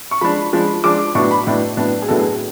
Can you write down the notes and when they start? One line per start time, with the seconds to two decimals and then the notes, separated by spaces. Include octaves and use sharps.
0.11 C#6
0.21 F3 G#3 D4 B5
0.53 F3 G#3 D4
0.84 F3 G#3 D4 D6
1.15 A2 F#3 B3 D4 C#6
1.31 B5
1.47 A2 F#3 B3 D4
1.77 A2 F#3 B3 D4
2.02 G#4
2.08 A2 F#3 B3 D4 A4
2.19 G#4